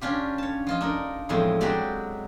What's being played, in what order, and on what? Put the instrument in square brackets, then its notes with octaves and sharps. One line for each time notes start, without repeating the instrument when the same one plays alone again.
[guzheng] C#4 D4 F4 G4
C#5 A5
F3 F4 D#5
D4 D#4 A#4
E2 A2 F3 G#3 C4
F#3 G#3 C4 F#4 G4 D5